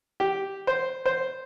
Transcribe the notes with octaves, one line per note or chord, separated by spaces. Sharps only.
G4
C5
C5